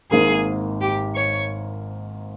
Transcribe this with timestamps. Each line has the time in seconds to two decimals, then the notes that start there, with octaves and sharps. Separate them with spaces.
0.11 G#1 G#2 D#3 A#3 G#4
0.81 G4
1.16 C#5